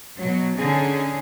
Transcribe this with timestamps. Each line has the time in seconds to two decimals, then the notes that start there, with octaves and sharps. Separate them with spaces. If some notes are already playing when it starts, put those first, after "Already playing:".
0.19 B2 F#3
0.57 D3 C#4 D#4 G#4